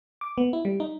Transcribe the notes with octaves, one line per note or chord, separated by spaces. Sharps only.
D6
B3
E4
G3
D#4